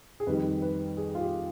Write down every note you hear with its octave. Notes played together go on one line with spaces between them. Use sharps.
G#4
F2 D#3 G3 B4
B4
G#4
F4
G4